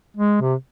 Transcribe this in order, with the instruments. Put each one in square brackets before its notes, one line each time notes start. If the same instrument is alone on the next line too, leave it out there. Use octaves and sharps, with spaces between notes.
[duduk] G#3
C3